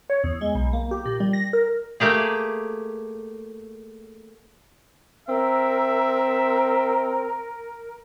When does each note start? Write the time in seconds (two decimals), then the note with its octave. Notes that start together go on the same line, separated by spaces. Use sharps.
0.10 C#5
0.24 E2
0.41 G#3
0.55 B1
0.73 A#3
0.91 G4
1.05 A#2
1.20 G3
1.33 A#6
1.53 A#4
2.00 A3 A#3 G4 G#4
5.29 C4 A#4 E5